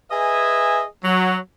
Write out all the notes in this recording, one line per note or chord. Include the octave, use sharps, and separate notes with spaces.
G#4 B4 D#5 E5 G#5
F#3